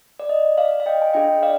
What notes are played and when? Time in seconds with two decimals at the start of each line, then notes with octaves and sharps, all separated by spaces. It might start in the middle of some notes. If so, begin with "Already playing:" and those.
0.20 D5
0.29 D#5
0.58 D5 F5
0.80 F5
0.86 D#5 G5
1.02 G#5
1.13 D4 F4 G#4 D#5 G5
1.43 D5 F5